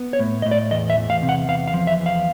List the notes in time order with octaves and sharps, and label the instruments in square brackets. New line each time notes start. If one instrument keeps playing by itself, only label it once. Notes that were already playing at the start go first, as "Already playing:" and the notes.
Already playing: [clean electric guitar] B3
C#5
A2
A2 D#5
D5
E2 D#5
E5
E2
F5
C3
F#5
E2 F5
F5
F3
E5
E2
F5